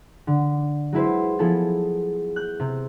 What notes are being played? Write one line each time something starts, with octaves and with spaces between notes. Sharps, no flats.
D3
F#3 G#3 E4 B4 C5
F3 B3 E4 G#4 A4
F#6 G6
C3